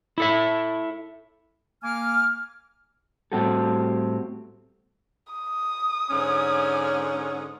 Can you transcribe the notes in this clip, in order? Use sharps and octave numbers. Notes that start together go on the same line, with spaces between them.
E4 A4 E5
A#3 G#5 D6 F6
A2 G3 C4 F#4 G4 A4
D#6
G#2 D3 C#4